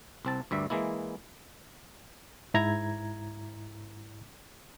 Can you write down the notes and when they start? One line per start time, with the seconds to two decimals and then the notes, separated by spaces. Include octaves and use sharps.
0.25 C2 C4 A5
0.51 D2 G2 G3 E5
0.70 E3 G#3 A#3 E4
2.54 G#2 E4 A#5 G#6